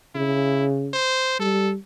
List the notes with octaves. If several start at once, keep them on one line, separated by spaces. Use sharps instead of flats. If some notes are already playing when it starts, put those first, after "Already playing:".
C#3 E4
C5
G3 A4